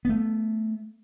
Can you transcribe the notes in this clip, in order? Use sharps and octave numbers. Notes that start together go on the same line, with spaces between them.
A3 B3